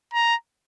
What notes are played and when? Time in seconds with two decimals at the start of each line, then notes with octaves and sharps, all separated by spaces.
0.14 A#5